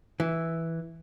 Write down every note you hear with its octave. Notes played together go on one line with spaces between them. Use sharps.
E3